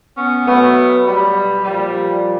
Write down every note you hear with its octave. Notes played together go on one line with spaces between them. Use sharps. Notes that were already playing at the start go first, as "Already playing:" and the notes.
B3 C#4
B2 F#3 A3 B3
G3
A#2 F3 G3